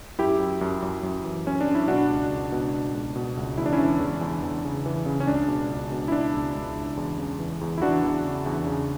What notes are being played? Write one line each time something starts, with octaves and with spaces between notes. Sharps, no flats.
F#2 E4 G4
F#2
F#2
F#2
F#2
E3
F#2 C#4
D4
F#2
E4
B2 D4 F#4
C#2
C#2
B2
B2
C#2
B2
C#2
E2 E4
D4
C#4 E4
E3
E2
E2
E2
C#3
E3
C#3
C#4
C#2 D4
B2
C#2
B2
E4
B2 D4
C#2
C#2
C#2
E2
C#3
E3
E2
E4
E3 D4 F#4
E2
C#3
E2
C#3